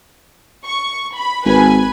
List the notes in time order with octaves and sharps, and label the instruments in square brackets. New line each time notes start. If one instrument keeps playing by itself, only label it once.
[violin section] C#6
B5
[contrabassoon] G#1 [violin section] B4 G#5 B5